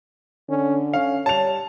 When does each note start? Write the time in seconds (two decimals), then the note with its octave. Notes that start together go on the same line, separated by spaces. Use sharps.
0.49 D3 C#4
0.93 C#4 F5
1.26 G3 C#5 A5 F7